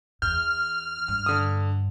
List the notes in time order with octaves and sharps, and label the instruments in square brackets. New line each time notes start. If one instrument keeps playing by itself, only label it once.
[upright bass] E2 [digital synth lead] F6 [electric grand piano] G6
[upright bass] G2
[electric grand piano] D3 D#6